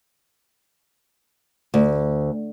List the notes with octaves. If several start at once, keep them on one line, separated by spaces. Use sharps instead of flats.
D2